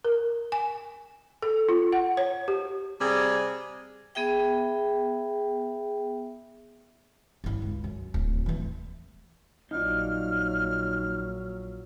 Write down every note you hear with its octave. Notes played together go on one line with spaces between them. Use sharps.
A#4
G#5
A4
F4
F#5
C#5
G4
C3 G3 G#4
B3 G#4 E5 G5
G1 E4
C#2
F#2
D1
E3 A3
A#1 F#3 D#4 F4 D5 F6